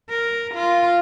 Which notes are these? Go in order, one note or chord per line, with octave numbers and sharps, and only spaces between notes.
A#4
F4